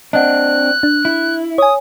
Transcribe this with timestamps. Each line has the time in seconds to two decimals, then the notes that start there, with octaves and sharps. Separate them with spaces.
0.13 C4 D4 D#5 F#5 F#6
0.83 D4
1.05 E4
1.58 C#5 G#5 D#6